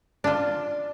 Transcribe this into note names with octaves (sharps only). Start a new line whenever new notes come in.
D4 F4